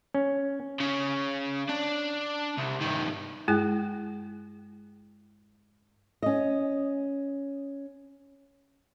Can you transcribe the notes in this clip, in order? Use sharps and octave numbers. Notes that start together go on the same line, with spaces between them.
C#4
C#3
D4
C2
G2 D#3
G2 G#3 E4 G#4 G5 F#6
C#4 D#5